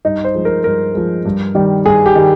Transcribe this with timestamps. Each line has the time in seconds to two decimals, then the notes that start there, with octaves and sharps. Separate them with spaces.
0.05 G2 D#4
0.24 C5
0.35 F3 G#3
0.45 A#4
0.64 G2 A#4
0.94 F3 G#3
1.25 G2
1.55 D#3 G3
1.86 G2 G#4
2.06 G4
2.15 D#3 G3